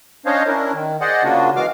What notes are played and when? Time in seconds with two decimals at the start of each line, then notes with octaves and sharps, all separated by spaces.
0.26 C#4 D4 C5 C#5 D#5 F5
0.47 C#4 D4 E4 A#4
0.73 D#3
1.01 G#4 C5 D5 D#5 F#5
1.24 C#3 A#3 D4 F4 F#4
1.56 E3 G#3 F#4 F5 D6 F6